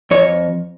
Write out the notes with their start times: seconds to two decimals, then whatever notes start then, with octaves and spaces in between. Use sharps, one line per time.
0.11 F2 C#5